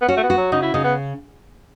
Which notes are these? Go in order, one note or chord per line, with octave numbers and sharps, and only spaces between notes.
B3
C#4 F#4
A3
B3
F#4
F#3
C#3 D#4
E4
C#3 D#4
B3